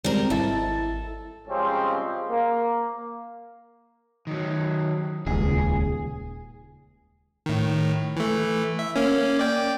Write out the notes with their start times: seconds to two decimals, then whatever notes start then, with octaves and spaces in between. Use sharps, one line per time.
0.04 G3 G#3 C4 A#4
0.30 G#1 E4 A4 A6
1.48 C#3 F3 G3 G#3 C4 C#4
2.30 A#3
4.27 D#3 F#3
5.26 D#1 C#2 G#4
7.46 A2 D#3
8.16 E3 A3
8.79 E5
8.96 A#3 C#4
9.39 D5 G5